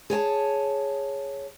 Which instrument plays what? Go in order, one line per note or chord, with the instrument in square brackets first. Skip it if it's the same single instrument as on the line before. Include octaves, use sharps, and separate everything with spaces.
[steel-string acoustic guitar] G#4 C#5 G#5 A5